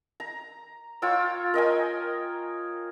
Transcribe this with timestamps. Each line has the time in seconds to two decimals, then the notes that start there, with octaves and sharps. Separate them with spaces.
0.20 A#5
1.02 F4 C#5 G5 E6
1.54 A#4 D#5 G5 G#5